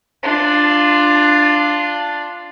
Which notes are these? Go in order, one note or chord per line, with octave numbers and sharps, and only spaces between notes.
D4 F4